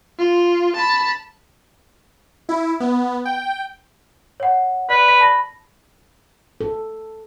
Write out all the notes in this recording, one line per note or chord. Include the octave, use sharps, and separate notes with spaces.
F4
A5 B5
E4
B3
G5
C#5 F#5
B4 D5
D5 B6
A5 B5 A#6
A4